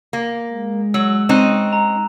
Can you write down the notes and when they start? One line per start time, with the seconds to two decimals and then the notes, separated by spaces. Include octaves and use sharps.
0.13 A#3
0.50 G#3
0.94 F#3 E6 F#7
1.29 C4 C#4 D#4 F#6 E7
1.73 A#5